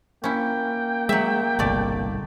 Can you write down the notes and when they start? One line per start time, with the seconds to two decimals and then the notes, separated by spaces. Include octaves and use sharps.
0.24 A#3 C#4 E4 G5
1.09 F#3 G#3 E5
1.59 G1 C2 B2 A3 D5